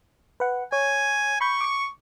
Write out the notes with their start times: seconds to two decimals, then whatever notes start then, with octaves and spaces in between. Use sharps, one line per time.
0.40 B4 F#5
0.72 C#5 G#5
1.41 B5 C#6 G6
1.61 D6 C#7